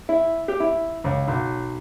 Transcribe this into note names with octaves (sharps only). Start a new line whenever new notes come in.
E4
G4
E4
C#2
B1